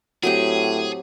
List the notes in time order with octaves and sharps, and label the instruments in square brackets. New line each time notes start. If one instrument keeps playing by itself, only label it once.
[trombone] A2 [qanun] F#3 C4 G4 [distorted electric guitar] G#4